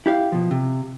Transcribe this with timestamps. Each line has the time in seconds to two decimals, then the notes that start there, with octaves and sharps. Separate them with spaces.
0.06 E4 G4 E5 F5
0.32 B2 F3
0.51 C3